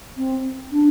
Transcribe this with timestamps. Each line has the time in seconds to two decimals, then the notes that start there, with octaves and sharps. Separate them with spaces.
0.17 C4
0.71 D4